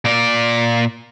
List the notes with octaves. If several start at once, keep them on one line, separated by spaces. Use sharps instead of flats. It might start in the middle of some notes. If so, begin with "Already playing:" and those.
A#2 D5